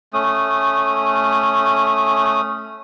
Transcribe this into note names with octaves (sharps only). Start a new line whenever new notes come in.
A3 C#4 D#6